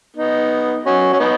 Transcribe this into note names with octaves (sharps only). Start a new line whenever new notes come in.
B3 D#4
C#4 F#4
C#4
B3 D#4